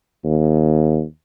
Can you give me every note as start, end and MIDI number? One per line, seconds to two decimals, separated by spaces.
0.24 1.03 39